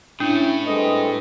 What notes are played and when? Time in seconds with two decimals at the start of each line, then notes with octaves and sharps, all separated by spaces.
0.20 A2 C#4 D4 E4
0.67 G3 G#3 C4 A4 B4 D#5